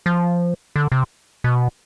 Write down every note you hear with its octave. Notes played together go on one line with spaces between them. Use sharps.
F3
D3
C3
B2